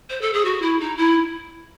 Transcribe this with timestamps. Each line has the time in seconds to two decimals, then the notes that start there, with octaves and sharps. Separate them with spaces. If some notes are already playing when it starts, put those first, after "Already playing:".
0.10 C5
0.21 A4
0.33 G#4
0.45 F#4
0.62 E4
0.80 D#4
0.97 E4